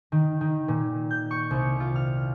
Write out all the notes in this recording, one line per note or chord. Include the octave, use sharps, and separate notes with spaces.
D#3
D#3
A#2
G6
C#6
C2
F4
F6